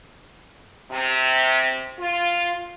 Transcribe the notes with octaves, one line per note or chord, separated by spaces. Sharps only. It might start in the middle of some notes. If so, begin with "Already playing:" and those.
C3
F4